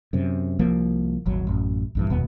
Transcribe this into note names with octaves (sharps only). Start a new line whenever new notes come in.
F#2 C3
C2 F3 A#3
D#1 G#1 F#3
A1 F#2
A#1 G2 E3
F1 D#2 B2 B3